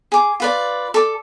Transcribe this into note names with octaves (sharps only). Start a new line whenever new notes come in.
G#4 D6
F4 B4 D5
A4 D6